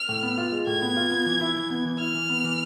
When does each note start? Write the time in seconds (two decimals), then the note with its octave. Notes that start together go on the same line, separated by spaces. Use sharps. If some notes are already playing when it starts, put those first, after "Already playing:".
Already playing: F6
0.09 A2
0.23 B3
0.38 F4
0.52 G#3
0.67 A2 G#6
0.82 B3
0.97 F4
1.11 B3
1.26 E3
1.41 E4
1.55 E3
1.70 B3
1.85 E3
1.99 E4 F6
2.14 E3
2.29 B3
2.44 E3